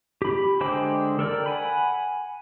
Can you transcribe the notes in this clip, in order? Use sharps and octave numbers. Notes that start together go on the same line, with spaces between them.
G4 B5
D3 G#3 C5 G5 D6
A4 A#4 D5 G5
F#5 G#5 B5